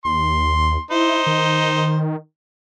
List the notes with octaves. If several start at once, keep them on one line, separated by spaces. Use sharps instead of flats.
D#2 C6
D#4 E4 C5
D#3